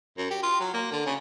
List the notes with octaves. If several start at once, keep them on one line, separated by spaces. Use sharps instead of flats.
F#2
G4
F4
F#3
A#3
D3
C#3